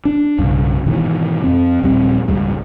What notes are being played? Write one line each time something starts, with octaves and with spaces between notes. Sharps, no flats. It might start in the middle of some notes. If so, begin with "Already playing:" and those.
D4
B1 G2 C#3
G#2 B2 D#3 E3
F2 C4
D#1 A#1 G3 C4
G#1 C#2 G#2 G3